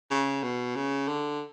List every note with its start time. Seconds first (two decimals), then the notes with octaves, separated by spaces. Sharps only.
0.11 C#3
0.43 B2
0.76 C#3
1.08 D3